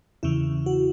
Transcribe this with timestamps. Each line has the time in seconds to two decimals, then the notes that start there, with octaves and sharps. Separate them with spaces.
0.23 E2 C#3 E3 E4
0.66 F#4